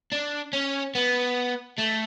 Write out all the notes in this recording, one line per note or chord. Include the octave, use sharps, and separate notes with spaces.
D4
C#4
B3
A3